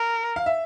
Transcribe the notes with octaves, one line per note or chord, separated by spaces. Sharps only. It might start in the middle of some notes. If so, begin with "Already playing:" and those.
Already playing: A#4
F5
E5